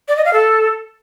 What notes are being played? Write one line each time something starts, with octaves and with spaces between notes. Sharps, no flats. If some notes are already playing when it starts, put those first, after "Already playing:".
D5
D#5
F5
A4